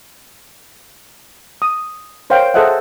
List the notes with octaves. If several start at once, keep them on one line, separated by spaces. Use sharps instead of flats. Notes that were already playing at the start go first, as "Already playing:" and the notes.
D#6
A#4 C5 C#5 F5 G5
G#4 A4 C5 D#5 E5 F#5